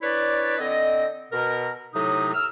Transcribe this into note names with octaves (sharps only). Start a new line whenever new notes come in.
D4 E4 B4 C#5 D5
D3 C4 D#5
B2 A#4
A2 C3 F#3 D#4 D#6
E6 F6